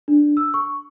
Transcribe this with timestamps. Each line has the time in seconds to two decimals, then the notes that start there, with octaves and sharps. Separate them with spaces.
0.08 D4
0.37 E6
0.54 C#6